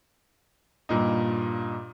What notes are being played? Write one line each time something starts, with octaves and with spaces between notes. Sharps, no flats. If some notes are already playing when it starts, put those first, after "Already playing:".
G2 A#2 D#4